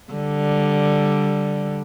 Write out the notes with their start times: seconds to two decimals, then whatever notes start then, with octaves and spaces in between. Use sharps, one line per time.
0.13 D3 G3